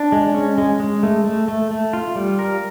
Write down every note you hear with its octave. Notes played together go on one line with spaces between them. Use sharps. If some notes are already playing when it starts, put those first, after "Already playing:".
Already playing: D4
G#3
C#4
G#3
G#3
A3
A3
A3
A3
F4
G3
A#4